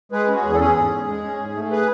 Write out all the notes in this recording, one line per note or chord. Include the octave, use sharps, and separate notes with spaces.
G#3 G#4 B4
C#4
F#4
E2 G#4
A4
C#4 G#4
G#2
G#2
G#3
C#4
G#2
A3
G#4 B4